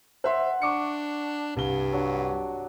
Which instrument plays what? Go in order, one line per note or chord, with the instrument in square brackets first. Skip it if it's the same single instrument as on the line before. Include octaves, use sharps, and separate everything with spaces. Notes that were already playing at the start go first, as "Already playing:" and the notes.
[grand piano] C5 E5 C6 [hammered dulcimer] F#5
[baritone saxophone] D4 [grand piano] C#6 D6 C#7
[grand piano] C2 G7 [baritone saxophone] G2
[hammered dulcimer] F#3 D4